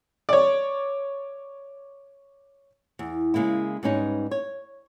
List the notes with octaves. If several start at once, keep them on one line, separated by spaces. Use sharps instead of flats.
C#5 D5
E2
C#3 G#3 A#3 E4
G#2 G3 C#4 D#4 B4
C#5